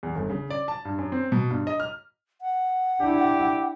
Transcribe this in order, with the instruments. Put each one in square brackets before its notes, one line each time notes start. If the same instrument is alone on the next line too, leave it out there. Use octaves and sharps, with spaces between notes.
[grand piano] E2
G1
C#3
D5
A5
G2
F#2
C4
B2
G2
D#5
F6
[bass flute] F#5
[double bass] D4 E4 [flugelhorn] G4